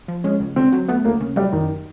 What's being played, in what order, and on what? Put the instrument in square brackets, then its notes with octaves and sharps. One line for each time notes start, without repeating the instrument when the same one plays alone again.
[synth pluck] F3
[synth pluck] G#3 [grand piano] C#4
[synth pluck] C#2
[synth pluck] D3 [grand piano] C4
[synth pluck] F#3
[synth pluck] A3 [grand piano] B3
[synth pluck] D2 [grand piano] A#3
[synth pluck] C#3
[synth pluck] F#3 [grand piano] G3
[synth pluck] F#2 [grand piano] D#3